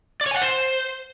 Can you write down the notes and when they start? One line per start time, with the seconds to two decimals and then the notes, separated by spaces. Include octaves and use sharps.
0.21 D5
0.26 C#5
0.31 G#5
0.36 F#5
0.42 C5